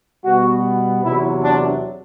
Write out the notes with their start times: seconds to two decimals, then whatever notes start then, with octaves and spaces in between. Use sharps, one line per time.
0.24 B2 G3 B3 F#4
1.03 E2 C3 F#3 E4
1.42 D4